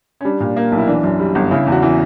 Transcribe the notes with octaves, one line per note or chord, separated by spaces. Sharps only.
C#4
G3 D4
A#2
A#3
B1
E4
E3 D4
F#2
G3
G1
C#3 E4
E2
F#4
E3